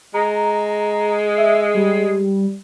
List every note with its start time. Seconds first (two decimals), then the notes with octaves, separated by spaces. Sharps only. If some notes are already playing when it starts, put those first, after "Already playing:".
0.14 G#3 A#5
1.37 E5
1.75 G3